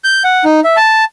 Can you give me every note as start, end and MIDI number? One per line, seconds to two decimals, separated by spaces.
0.04 0.23 91
0.24 0.44 78
0.45 0.60 63
0.64 0.76 76
0.77 1.04 81